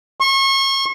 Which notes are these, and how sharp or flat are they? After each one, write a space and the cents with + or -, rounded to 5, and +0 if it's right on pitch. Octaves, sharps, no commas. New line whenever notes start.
C#6 -35